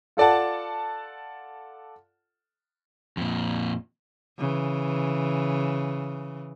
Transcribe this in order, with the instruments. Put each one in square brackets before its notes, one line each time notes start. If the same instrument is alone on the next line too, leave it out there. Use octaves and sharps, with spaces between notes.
[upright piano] F4 A4 D5 F#5 A5
[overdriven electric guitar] F2 A#2
[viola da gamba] C#3 E3